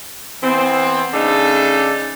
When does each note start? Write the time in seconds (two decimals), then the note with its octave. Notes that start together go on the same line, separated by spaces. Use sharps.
0.43 E3 B3 C4
1.14 C#3 A3 D4 D#4 A4